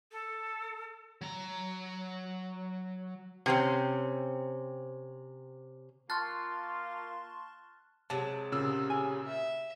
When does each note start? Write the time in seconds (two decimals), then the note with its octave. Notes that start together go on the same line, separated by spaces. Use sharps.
0.12 A4
1.21 F#3 A#5
3.46 C3 C4 C#4
6.10 A#3 F4 A5 C6 C#6 F6 F#6 A6
8.10 C3 F#3 G#3 A5
8.52 A#2 C#3 E6
8.90 G#5
9.26 E5